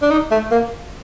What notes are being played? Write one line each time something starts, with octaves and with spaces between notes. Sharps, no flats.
D4
D#4
A3
A#3